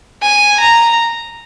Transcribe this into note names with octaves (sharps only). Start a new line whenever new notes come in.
G#5
A#5